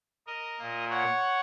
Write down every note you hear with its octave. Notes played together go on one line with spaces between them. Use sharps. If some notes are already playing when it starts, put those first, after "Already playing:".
A#4 D#5
A#2 A#3
C#5 F#5